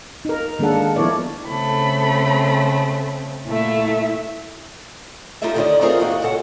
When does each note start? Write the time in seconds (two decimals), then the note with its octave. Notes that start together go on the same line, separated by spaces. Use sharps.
0.25 D#4 A#4
0.59 D#3 G#3 A#3 D4 A4 F#5
0.96 F3 B3 E4 A#4 C#5 D5
1.47 C#3 A3 C4 A4 B5
3.47 A#2 A3 E4 E5
5.42 D#4 F4 G4 A4 D#5 E5
5.55 D3 D#3 B3 D#4 D5 D#5
5.81 A3 C4 D#4 F4 G#4 A#4
6.00 D#2 A2 D#3 A#3 F#4 D#5
6.22 A#2 C#3 A4 F#5